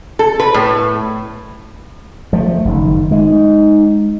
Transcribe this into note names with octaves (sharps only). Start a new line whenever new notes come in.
A4
B4
A2
F3 A3
F#1 D#3
G#3 D#4